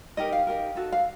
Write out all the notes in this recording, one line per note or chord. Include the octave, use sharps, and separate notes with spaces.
D#4 G4 A#4 D#5
F5
D#4 G4 A#4
D#4 F#4 A4
F5